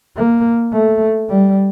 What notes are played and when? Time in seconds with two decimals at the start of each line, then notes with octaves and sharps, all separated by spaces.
0.17 A#3
0.73 A3
1.29 G3